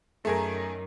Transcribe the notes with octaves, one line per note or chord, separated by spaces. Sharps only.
F#2 D#3 A3 G#4 A#4